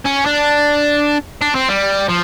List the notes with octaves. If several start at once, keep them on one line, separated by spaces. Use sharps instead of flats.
C#4
D4
D4
C4
G3
F3